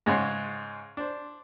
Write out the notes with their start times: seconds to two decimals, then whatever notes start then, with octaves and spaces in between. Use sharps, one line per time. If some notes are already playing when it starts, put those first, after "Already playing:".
0.06 G#2 C#3 G#3 C#5 F#5 C6
0.97 D4 C5